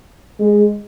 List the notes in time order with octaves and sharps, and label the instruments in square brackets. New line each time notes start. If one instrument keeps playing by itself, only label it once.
[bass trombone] G#3